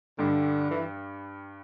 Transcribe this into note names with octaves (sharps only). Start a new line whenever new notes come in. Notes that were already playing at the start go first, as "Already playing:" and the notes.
G2 D3 G3
E3